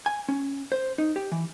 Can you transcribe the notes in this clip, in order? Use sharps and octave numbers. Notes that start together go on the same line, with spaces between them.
G#5
C#4
C5
D#4
G4
E3